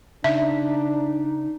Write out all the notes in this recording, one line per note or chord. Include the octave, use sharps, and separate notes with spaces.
C#3 D4 D#4 E5